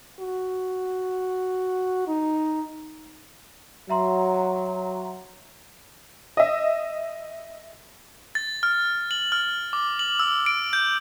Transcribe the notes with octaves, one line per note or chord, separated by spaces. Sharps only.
F#4
D#4
F#3 E5 A#5 C6
D#5 E5
A6
F6
F#7
F6
D6
F#7
E6
D7
G6